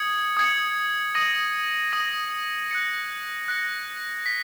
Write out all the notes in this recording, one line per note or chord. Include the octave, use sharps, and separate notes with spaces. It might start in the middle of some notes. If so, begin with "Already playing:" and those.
Already playing: D#6 G#6 C#7
D#6 G#6 C#7
D#6 A#6 D#7 F#7
D#6 A#6 D#7 F#7
F#6 A#6 C#7
F#6 A#6 C#7
B6